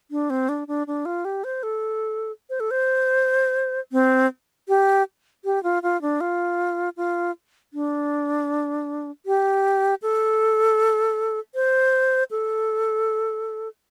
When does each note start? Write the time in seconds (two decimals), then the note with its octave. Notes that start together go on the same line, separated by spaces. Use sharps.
0.11 D4
0.30 C4
0.49 D4
0.68 D4
0.87 D4
1.05 F4
1.25 G4
1.44 C5
1.63 A4
2.50 C5
2.60 A4
2.71 C5
3.92 C4
4.68 G4
5.45 G4
5.63 F4
5.83 F4
6.02 D4
6.21 F4
6.97 F4
7.73 D4
9.26 G4
10.02 A4
11.55 C5
12.31 A4